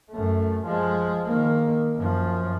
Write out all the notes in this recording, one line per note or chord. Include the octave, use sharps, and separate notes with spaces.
F#2 A3
F3 G#3
D#3 A#3
F#2 F3